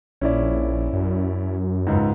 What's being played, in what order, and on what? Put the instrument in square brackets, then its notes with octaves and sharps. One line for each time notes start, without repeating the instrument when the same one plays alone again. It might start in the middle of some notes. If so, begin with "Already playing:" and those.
[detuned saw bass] A#1 [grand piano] C#4 E4 D5
[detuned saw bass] F#2
[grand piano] C#2 G#2